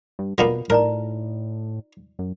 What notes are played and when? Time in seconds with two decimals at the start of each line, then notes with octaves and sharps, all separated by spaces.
0.19 G2
0.38 B2 D3 A#3 B3 F4
0.70 A2 D#4 A#4 D5 A#5
2.19 F#2